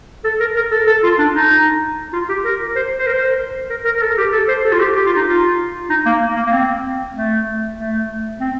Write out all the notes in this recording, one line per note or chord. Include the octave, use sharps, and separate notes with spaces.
A4
A#4
A#4
A4
A4
F4
D4
D#4
F4
G4
A#4
C5
C5
A#4
C5
A#4
A#4
A#4
A4
G4
A4
C5
A4
F4
G4
G4
F4
D#4
F4
D#4
A#3
A#3
A#3
C4
A3
A3
C4